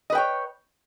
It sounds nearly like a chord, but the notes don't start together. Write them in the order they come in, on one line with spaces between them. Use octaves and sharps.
D#5 B4 G5 C#5